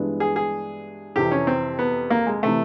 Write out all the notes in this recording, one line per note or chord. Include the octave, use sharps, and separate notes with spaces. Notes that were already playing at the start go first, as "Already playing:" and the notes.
Already playing: G2 E3 G#3 B3 D4
G#4
G#4
F2 C3 E3 G4
C#4
C4
B3
A#3
G#3
C3 E3 A3